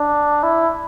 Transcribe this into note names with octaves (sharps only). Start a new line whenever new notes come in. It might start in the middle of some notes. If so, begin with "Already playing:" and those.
Already playing: D4
E4